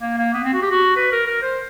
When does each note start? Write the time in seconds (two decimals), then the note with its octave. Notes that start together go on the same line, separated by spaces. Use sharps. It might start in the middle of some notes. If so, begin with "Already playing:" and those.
0.02 A#3
0.18 A#3
0.34 B3
0.44 C4
0.53 F#4
0.62 G4
0.70 F#4
0.96 B4
1.12 A#4
1.27 A#4
1.42 C5